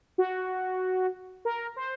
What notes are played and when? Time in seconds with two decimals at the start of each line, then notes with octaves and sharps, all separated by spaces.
0.18 F#4
1.45 A#4
1.76 C5